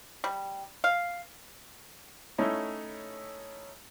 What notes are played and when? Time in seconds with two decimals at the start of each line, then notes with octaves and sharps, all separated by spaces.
0.24 G3
0.84 F5
2.38 A3 C#4 D#4 E4 A4